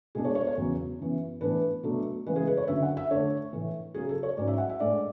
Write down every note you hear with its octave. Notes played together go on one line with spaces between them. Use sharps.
B2 G#3 D4 G#4
C#5
C#5
C#5
E2 C#3 F#3
F#2 E3 B3
A2 E3 B3 D4 B4
B2 F#3 A3 D4
C#3 E3 G#3 B4
G#4
B4
C#5
F#2 D3 F#3 E5
F#5
E5
D3 A3 D4 C#5
A2 E3 A3
C#3 F#3 C#4 G#4
A4
C#5
G#2 F#3 C#4 D5
E5
F#5
E5
A2 G#3 D4 D5